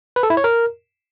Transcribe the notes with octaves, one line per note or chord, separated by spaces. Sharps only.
B4
A4
E4
C#5
A#4